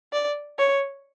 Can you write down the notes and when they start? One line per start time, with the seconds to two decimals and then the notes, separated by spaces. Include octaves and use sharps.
0.13 D5
0.59 C#5